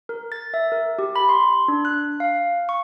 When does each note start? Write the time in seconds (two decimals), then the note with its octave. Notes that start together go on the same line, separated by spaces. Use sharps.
0.09 A#4
0.32 A6
0.54 E5
0.72 A#4
0.99 G4
1.16 B5
1.29 C6
1.68 D4
1.85 F#6
2.20 F5
2.69 C#6